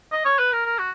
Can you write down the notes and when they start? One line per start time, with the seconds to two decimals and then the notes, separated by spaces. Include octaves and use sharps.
0.12 D#5
0.25 C#5
0.39 B4
0.52 A#4
0.66 A#4
0.79 F#4